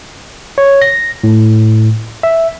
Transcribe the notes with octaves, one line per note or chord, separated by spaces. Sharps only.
C#5
A#6
A2
E5